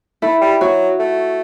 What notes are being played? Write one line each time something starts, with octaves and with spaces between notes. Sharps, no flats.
A3 E4
G3
F#3 F#4
A3